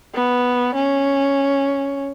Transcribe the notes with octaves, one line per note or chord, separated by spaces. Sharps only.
B3
C#4